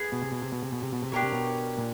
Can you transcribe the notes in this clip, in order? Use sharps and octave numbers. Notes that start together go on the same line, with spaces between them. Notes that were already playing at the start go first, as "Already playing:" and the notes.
Already playing: B3 G#4
B2
C3
B2
C3
B2
C3
B2
C3
B2
C3
B2 D4 G4 A#4 C#5
C3
B2
A#2